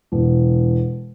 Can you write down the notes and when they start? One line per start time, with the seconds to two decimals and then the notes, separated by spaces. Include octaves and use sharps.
0.12 E1